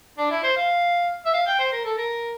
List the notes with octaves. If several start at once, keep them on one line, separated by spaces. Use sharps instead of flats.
D4
E4
C5
F5
E5
F5
G5
C5
A#4
A4
A#4